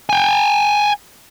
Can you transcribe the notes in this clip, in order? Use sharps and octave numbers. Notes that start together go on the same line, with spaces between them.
G5 G#5